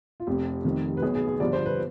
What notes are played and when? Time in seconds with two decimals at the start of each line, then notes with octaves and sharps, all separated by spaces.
0.20 F4
0.27 F1 F2 C3 G4
0.65 F1 F2 C3 D#3
0.97 B4
1.02 B1 B2 B3 G#4
1.15 G#4
1.28 G#4
1.40 G1 G2 F3 D5
1.53 C5
1.65 B4